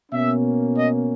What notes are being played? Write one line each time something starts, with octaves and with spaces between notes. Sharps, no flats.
B2 A#3 C#4 E5
D#5